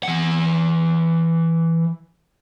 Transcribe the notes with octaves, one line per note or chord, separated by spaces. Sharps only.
E3 F#5